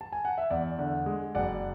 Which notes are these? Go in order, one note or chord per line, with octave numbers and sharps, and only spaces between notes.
A5
G#5
F#5
E5
E2 D5
D3
G#3
F#1 D5 F#5